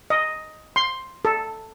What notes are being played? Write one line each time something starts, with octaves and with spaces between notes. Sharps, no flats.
D#5
C6
A4